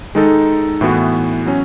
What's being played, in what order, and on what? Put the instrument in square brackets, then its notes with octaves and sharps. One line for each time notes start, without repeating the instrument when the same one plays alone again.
[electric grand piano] D#3 G#3 D#4 A4
A2 E3 B3 F#4
F#3 C#4